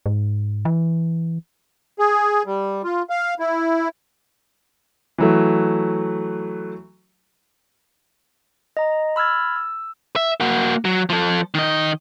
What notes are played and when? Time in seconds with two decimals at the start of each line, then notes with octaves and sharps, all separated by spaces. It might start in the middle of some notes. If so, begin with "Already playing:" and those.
0.06 G#2
0.65 E3
1.99 G#4
2.46 G3
2.84 F4
3.10 F5
3.40 E4
5.18 E3 F#3 A3
8.77 D#5 A#5
9.16 B5 E6 F6 G#6 A6
9.56 E6
10.16 E5
10.40 A#3 F#4
10.85 F#3
11.09 F3 A4
11.54 D#3 D#5